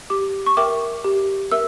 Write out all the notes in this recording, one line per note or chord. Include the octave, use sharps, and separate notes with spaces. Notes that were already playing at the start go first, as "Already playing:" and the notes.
G4 D6
C#6
A#4 E5 G5 D6
G4
A#4 E5 E6